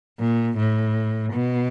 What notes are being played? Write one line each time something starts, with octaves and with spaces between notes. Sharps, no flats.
A#2
A2
B2